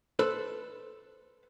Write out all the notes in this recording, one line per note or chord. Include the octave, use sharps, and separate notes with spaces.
A4 B4 C5